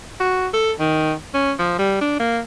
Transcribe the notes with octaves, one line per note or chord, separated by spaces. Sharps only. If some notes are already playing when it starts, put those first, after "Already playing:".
F#4
A4
D#3
C#4
F3
G3
D4
A#3